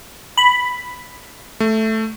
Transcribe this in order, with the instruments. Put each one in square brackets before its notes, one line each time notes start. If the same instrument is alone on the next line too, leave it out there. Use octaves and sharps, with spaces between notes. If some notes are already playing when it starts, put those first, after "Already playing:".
[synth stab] B5
[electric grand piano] A3